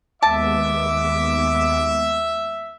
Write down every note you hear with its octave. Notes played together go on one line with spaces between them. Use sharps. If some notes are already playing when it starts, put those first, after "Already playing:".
D#2 G#3 B3 E5 A5 D6